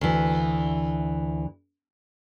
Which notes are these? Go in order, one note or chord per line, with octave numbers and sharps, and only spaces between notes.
D2 E3